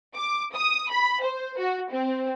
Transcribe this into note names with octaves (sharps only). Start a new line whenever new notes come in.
D6
D#6
B5
C5
F#4
C4